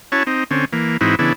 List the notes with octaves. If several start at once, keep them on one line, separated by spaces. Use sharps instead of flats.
C#4 E4 F#4 C#5 A5
C4 D#4
D3 C4 C#4
E3 A#3
G#2 E3 C4 D#4 E4 F#4
C#3 E3 B3 D4 E4